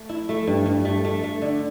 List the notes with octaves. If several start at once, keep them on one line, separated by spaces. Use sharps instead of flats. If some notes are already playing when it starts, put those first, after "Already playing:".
Already playing: A3
E4
A3
G2
G2
A3
A3
A3
D3